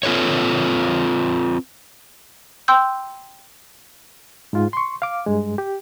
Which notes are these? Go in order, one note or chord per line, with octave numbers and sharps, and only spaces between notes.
C4 F4 A4 B4 C#5
G5 C6 E6 G6
G#2 F4
C6 C#6
F5 D6
G2 G#3
G4